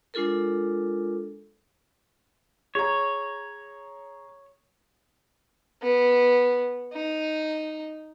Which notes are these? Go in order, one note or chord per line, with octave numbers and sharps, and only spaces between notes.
G#3 D4 F4 A4 A#4
G#4 C#5 A#5
B3
D#4